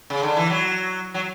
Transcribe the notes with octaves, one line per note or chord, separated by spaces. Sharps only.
C#3
D3
E3
F#3
F#3